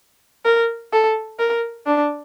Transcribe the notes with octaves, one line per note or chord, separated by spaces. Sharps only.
A#4
A4
A#4
D4